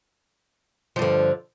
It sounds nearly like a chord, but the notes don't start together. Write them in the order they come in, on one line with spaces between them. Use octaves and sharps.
F3 G2 D3